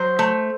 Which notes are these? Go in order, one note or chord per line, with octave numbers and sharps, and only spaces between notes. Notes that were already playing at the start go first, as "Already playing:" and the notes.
Already playing: F#3 C5
A3